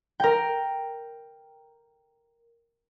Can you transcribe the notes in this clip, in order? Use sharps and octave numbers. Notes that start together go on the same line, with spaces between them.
A#4 G5